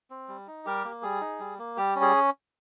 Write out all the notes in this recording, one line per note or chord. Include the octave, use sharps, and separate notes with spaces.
C4
G3
D#4
G3 G4 A#4
A#3
G3 G#4
D#4
G3
A#3
G3 G4
C#4
G#4